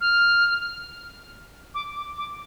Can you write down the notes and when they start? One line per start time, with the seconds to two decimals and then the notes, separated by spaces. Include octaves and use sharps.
0.01 F6
1.75 D6
1.96 D6
2.18 D6